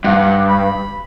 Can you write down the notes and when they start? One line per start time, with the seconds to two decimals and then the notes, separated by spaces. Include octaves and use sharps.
0.04 G2 F#5
0.49 B5